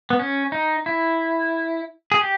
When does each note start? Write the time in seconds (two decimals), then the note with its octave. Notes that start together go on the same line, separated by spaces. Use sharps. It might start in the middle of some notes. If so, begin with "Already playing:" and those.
0.10 B3
0.19 C#4
0.52 D#4
0.86 E4
2.12 G#4
2.21 G4